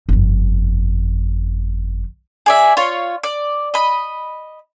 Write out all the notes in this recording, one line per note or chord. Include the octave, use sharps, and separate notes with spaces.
G1 F2
G#4 D5 E5
F4 C#5
D5
D#5 B5